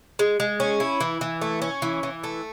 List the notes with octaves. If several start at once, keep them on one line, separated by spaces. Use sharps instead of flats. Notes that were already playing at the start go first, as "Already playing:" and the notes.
G#3
G#3
C#4
E4
E3
E3
A3
C#4
E3
E3
A3